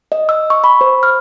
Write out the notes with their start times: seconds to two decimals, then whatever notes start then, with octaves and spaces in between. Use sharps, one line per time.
0.12 D#5
0.29 E6
0.50 C#6
0.64 B5
0.81 C5
1.03 F6